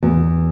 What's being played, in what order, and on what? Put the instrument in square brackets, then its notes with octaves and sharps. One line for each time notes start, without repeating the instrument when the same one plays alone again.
[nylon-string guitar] E2